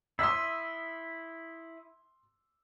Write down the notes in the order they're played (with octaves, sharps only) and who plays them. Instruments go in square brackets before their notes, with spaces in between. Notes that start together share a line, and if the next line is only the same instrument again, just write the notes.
[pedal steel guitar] E4 E5 D#6 [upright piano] C6 E6